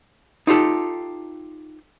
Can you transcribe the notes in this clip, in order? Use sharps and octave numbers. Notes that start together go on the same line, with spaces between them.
D#4 F4 G4 A4